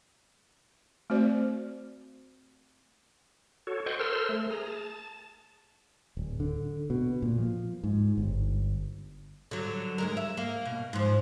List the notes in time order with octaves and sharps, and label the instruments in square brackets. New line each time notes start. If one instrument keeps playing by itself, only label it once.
[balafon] A3 C4 F#4 C5 D5
[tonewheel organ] F#4 A4 C#5
C5 D#5 F#5 G5 C6 C#6
A4 A#4 C5 C6 E6 F6
A3
G#4 A#5
A5
[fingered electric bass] D1
D3
B2
A#2
F3
G#2
G1
[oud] D3 F#3
D2 G#3 A#4
E5
A#3
B2
G#2 F3